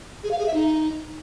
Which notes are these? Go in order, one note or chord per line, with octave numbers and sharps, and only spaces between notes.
G#4
F5
G#4
E5
D#4